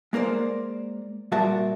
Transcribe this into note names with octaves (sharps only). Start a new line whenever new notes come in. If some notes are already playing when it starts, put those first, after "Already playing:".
G#3 A#3 A#4 C5 D5
A#2 G3 F#4 A#4 E5 A5